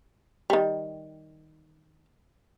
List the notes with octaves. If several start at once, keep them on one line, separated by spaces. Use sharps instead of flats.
D#3 G3